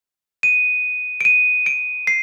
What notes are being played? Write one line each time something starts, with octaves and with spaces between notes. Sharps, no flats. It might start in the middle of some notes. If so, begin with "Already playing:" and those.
D#7
D7
D#7
D7
C7